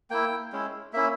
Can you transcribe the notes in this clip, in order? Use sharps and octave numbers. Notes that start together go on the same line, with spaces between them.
A#3 E4 G5
G#3 C#4 E4
A#3 C#4 E4 E5